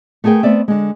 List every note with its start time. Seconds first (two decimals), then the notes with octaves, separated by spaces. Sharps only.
0.24 A3 B3 G#4 A#4 G5
0.43 A3 B3 C4 D5 E5
0.68 D3 G#3